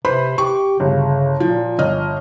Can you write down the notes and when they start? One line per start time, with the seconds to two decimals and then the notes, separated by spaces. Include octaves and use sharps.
0.05 C3 B4 C5 B5
0.38 G4 C#6
0.80 G1 C#3
1.40 A#2 F3
1.78 G1 D#5 F6